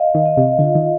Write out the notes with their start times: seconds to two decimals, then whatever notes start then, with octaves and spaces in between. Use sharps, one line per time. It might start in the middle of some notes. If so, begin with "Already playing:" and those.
Already playing: D#5 F5
0.15 D#3
0.26 D#5
0.37 C3
0.59 D3 F4
0.75 D#3